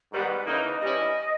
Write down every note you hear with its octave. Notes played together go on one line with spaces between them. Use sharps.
G#2 D#3 G3 B3 B4
C#3 E3 A#3 D#4 A#4
B4
D#5
G2 E3 G3 C#4 E4 D#5